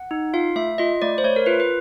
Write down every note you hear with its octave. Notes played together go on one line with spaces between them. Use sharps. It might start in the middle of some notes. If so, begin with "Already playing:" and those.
Already playing: F#5
D#4
F4 F5
A3 E5
F4 D#5
A3 D5
C5
A3 C#5
A#4
F4 B4
B4